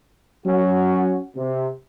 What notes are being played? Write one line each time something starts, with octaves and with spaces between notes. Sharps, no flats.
F#3 C#4 F#4
C3